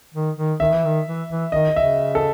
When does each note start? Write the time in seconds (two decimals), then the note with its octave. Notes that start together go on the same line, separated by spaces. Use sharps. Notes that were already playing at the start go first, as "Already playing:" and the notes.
0.14 D#3
0.37 D#3
0.60 D#3 E5
0.73 E3
0.85 D#3
1.07 E3
1.29 E3
1.52 D#3 D#5
1.76 C#3 E5
2.15 A4